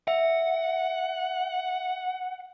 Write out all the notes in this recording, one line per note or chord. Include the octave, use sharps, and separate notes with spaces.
E5 F#5